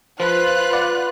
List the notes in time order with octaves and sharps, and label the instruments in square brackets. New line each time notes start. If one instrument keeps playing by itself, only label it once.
[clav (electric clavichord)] F3 [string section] F4 F#6 [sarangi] B4
[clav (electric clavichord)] D5 F#5